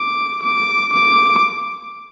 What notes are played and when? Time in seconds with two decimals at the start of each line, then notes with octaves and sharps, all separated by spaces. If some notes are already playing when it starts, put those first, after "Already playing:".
Already playing: D6
0.43 D6
0.93 D6